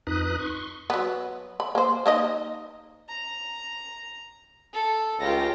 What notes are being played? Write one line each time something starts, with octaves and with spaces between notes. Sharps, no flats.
F2 D#4 B4 D#6 F#6
C6 C#6
F#3 B3
B5
A#3 C5
A#3 D#4 D#5
A#5
A4
C#2 F4 G4 A#6